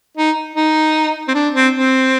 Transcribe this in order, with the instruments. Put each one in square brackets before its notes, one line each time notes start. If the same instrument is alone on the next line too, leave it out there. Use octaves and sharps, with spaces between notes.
[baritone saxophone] D#4
D#4
C4
D4
C4
C4